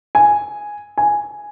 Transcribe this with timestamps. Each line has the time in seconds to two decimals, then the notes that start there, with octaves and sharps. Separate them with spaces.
0.15 G#5
0.98 G#5